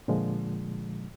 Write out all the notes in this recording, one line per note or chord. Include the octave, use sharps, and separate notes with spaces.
A#2 D3 F3 G#3